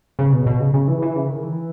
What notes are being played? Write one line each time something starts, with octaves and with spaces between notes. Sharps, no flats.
C#3
B2
B2
C#3
C#3
E3
E3
C#3
D#3
E3